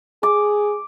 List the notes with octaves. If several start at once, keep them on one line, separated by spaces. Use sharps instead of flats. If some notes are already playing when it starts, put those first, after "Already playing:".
G#4 D6